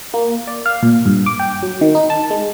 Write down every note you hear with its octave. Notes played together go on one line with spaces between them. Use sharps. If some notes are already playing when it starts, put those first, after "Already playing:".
A#3
D5
F5
A#2
G2
D6
G5
F#3
D#3
D#4
A5
G#3